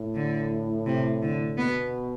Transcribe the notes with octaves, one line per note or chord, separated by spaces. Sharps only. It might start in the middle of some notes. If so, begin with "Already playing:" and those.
Already playing: A2
D3
C3
D3
B2 B3